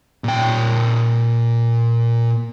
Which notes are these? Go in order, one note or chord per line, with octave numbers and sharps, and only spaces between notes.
A#2 G5